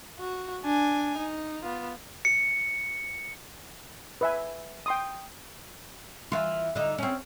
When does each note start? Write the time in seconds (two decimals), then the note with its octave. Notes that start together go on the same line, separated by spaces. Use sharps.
0.19 F#4
0.64 D4 G#5
1.17 D#4
1.63 B3 F4
2.25 C#7
4.21 B4 E5 G#5
4.86 G5 C6 D#6
6.32 E3 F4
6.75 D3 D#4
6.98 C4 C#4